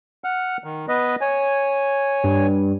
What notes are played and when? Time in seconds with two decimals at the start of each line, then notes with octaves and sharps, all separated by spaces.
0.24 F#5 F6
0.64 D#3
0.88 B3 B4 D#5
1.21 C#5 G#5
2.24 G2